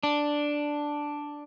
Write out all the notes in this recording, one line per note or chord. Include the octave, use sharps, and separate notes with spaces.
D4